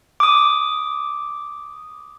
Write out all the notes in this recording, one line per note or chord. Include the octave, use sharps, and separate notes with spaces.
D6 D#6